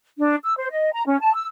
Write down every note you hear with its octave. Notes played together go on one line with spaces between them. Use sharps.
D4
E6
C5
D#5
A#5
C#4
A5
E6